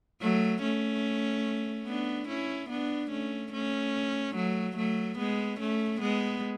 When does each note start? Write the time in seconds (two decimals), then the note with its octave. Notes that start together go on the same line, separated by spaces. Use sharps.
0.21 F#3 A3
0.62 A3 C#4
1.87 B3 D4
2.28 C#4 E4
2.70 B3 D4
3.11 A3 C#4
3.52 A3 C#4
4.35 F#3 A3
4.77 F#3 A3
5.18 G#3 B3
5.60 A3 C#4
6.01 G#3 B3